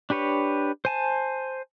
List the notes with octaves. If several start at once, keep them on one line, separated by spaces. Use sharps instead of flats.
D4 G4 B4 C#5
C5 G#5 A5